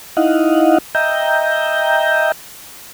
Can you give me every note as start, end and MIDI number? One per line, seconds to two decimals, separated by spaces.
0.17 0.78 63
0.17 0.78 64
0.17 0.78 75
0.17 0.78 77
0.17 0.78 78
0.95 2.32 75
0.95 2.32 76
0.95 2.32 79
0.95 2.32 82
0.95 2.32 91